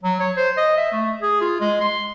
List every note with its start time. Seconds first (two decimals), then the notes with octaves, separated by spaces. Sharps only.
0.04 F#3
0.20 C#5
0.37 C5
0.57 D#5
0.77 E5
0.92 A3
1.22 G#4
1.41 F4
1.60 G#3
1.81 C6